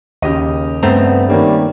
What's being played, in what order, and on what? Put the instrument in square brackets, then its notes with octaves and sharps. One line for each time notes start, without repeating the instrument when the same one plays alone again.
[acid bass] D#2 [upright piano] C#3 G4 D#5
[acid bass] G2 [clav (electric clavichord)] A3 C4 A#5 [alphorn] B3
[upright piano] D#3 A#3 C#4 [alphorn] G3